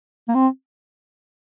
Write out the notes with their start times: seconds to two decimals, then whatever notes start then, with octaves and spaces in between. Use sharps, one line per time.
0.29 A#3
0.35 C4